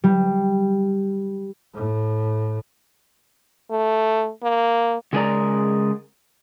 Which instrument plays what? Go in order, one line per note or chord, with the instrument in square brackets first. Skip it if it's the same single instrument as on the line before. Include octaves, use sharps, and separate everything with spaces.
[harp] G3
[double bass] A2
[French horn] A3
A#3
[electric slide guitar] C#3 G#3 G#4 A#4 D5 A#5